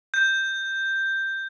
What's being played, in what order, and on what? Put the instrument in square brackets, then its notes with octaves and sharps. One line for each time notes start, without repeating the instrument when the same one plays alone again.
[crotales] G6